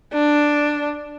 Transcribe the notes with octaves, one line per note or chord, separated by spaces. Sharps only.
D4